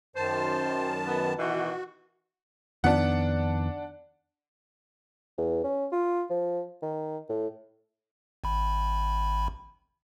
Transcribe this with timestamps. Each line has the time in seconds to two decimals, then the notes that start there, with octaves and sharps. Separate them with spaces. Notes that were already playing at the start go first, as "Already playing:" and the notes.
0.16 F#2 D#3 C5 A5
1.08 B3
1.39 B2 D#3 E3 F#4
2.84 F2 D#3 B3 D4 F#5
5.38 E2
5.64 C#4
5.92 F4
6.30 F3
6.82 D#3
7.30 A2
8.44 G#1 B5